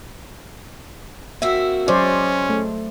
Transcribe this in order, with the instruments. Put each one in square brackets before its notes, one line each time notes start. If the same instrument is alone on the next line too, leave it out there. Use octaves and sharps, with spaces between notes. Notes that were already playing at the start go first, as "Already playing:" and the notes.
[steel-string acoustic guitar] A#3 C4 F#4 [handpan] E5
[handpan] F#3 C5 D5 [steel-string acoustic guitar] G#3 [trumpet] C#4
[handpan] A3